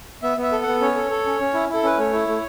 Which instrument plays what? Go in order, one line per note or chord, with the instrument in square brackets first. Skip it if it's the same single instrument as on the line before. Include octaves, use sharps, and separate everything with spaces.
[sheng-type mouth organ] B3 E5
B3
E5
A4
F#5
B3
C#4 C#5
A4
A4
C#4
C#4
E4
E4 A4
C#4 B4
A3 C#5
E4
A3